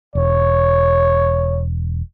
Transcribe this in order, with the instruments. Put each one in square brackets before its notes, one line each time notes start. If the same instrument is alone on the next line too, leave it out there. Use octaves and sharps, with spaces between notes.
[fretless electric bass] E1 [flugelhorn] C#5